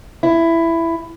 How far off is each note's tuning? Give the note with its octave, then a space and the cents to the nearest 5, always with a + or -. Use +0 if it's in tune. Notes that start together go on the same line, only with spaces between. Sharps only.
E4 +10